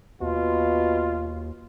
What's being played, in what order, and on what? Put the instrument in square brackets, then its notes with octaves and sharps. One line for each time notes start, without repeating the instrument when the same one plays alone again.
[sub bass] D#2 [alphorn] B2 [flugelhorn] F4